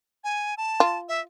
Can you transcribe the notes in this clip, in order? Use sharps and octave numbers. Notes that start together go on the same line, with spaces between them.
G#5
A5
F4
E5